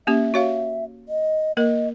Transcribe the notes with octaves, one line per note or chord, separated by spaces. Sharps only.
A#3 C#4 G4 E5
F#4 C#5 F5
D#5
A#3 A#4 D#5